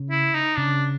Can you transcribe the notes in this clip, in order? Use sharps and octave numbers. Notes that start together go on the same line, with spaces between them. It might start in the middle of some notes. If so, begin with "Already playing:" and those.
Already playing: C#3
E4
D#4
C#3 D4